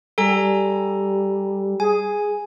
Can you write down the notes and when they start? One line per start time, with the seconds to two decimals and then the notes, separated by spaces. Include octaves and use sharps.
0.18 G3 A4 G#5 A#5
1.80 G#4 G#5